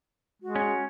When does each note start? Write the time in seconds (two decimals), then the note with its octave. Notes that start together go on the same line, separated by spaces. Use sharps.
0.42 G#3 F#4
0.56 C#4